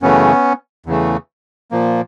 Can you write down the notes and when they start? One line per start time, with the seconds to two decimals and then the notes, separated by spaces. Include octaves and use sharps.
0.02 F#2 C#3 E3 A3 B3 C#4
0.86 E2 C#3 E3 A3
1.71 A#2 F3 A#3